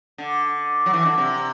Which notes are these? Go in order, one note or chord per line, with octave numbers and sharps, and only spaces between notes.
D3
F#3
E3
D3
C3